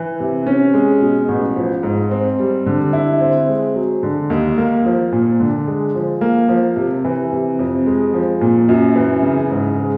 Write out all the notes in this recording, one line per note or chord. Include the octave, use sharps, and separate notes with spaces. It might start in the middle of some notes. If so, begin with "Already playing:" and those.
Already playing: E3
C3
C#4
G#3
B2
A1
F3
G#2
C4
G3
D3
E4
C4
G#3
F#3
D3
D#2
A#3
F3
A#2
D3
G#3
F3
A#3
F3
C3
E3
C3
F2
G#3
F3
A#2
F#2
E3
C#3
G#2
G#3